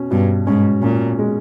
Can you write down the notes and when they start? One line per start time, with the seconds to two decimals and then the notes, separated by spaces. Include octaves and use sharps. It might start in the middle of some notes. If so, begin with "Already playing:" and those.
Already playing: B2 C#4
0.11 G2 B2
0.47 G#2 C#4
0.82 A#2 C#4
1.19 G#3